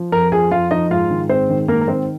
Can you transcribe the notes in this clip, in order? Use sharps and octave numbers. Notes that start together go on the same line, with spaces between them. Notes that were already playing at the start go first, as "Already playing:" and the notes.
Already playing: F3
F2 A#4 A#5
F3 G#4 G#5
F2 F4 F5
F3 D#4 D#5
G#2 F4 F5
D#3
G#2 C4 C5
D#3
G#2 A#3 A#4
A#4
D#3 C4 C5